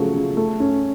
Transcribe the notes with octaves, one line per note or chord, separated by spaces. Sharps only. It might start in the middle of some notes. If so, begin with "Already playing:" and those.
Already playing: C#3 F3 F#3 A3
C#3
A3
C#4